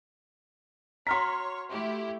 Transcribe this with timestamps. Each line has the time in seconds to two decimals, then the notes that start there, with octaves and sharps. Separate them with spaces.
1.07 F#4 C#5 A#5 C6 F6 B6
1.70 A3 E4 G4